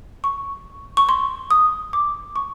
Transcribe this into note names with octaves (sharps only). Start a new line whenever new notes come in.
C#6
C#6
C6
D#6
D6
C#6